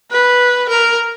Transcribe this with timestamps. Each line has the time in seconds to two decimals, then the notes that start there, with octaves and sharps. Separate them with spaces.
0.11 B4
0.69 A#4